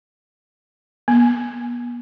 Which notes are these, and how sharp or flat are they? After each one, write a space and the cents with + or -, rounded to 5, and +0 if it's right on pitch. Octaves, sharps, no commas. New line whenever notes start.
B3 -45